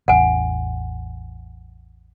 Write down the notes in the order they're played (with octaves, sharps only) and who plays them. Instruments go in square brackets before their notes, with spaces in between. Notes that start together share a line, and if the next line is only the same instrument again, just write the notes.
[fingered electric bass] A1 E2 [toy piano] F#5 G#5